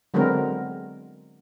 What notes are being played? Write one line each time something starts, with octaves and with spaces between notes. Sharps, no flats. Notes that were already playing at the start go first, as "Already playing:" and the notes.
D3 F#3 G#3 B3 C4 A#4